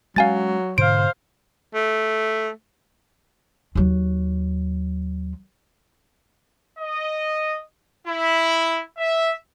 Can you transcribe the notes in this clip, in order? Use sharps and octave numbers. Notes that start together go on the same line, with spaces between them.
F#3 G#3 C#4 F5 G#5 A6
G#2 B2 D3 C5 F5 D7
A3
D#2 F#3
D#5
E4
E5